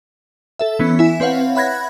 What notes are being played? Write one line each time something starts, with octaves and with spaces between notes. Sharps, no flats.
A4 E5
E3 B3 C#4
E4 E5 G#5
C4 B4 C#5 F5 F#5
E5 F#5 B5 F#6 G#6 A#6